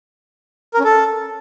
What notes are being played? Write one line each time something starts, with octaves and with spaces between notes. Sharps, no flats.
A#4
C#4
A4